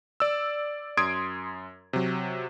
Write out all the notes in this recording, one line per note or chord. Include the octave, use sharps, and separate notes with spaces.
D5 E6
F#2 C6 D#6 G#6 D7
C3 F#3